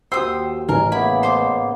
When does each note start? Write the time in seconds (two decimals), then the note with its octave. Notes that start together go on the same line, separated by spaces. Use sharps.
0.12 D#2 F#4 C5 G5 D#6 E6
0.69 A1 A#4 G#5
0.92 C#3 A#3 B3 E4 B5
1.23 C5 C6 D6